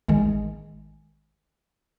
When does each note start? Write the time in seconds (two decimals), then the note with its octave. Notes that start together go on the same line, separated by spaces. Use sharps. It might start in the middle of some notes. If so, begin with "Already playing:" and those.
0.08 A1 D#3 G#3